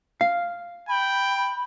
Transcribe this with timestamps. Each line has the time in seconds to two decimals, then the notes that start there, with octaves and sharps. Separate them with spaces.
0.21 F5
0.89 G5 B5